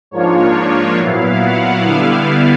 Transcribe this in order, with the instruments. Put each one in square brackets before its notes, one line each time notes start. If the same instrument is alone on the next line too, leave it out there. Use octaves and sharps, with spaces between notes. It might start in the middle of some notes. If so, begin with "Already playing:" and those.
[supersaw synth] G#2 F3 A#3 D4 F4 C#5
C#5
A#2 F#3 B3 E4 F5
F#5
D3 G3 B3 E4 F5